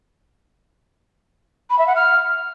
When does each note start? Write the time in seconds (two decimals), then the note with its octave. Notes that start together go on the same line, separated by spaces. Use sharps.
1.70 B5
1.79 E5
1.87 F#5
1.96 F6